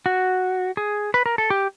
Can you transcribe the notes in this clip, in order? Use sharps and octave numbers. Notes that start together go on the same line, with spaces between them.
F#4
G#4
B4
A#4
A4
G4